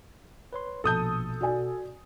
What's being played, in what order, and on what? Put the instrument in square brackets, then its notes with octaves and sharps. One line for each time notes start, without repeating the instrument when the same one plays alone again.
[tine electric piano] B4 C#5 C6
[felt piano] A#1 A5 [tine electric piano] B2 [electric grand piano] A4 D#6 G6
[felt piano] F#4 D5 G#5